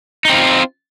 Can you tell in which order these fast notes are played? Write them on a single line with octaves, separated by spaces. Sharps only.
D#4 C4 F4